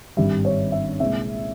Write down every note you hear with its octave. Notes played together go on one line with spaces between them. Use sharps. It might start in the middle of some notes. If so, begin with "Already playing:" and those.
G#1 G2 G3 E5
C#5
E5
C2 A#2 G#3 E5